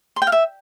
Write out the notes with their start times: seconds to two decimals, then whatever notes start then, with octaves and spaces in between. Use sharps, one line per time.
0.16 C6
0.22 G5
0.27 F5
0.32 E5